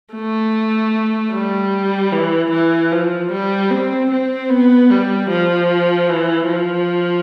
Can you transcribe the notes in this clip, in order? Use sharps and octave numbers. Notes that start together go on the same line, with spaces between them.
A3
G3
E3
E3
F3
G3
C4
C4
B3
G3
F3
E3
F3